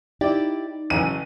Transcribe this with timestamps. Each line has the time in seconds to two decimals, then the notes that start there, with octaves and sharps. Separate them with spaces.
0.21 D#4 E4 G4 D5
0.90 A1 C#3 E3 F#3 G#3 D#7